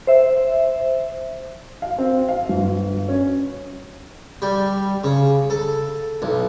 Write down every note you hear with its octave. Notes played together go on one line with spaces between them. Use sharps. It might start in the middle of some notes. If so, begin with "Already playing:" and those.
C5 E5
F5
C4
F5
G1
C#4
G3
C#3
A4
B1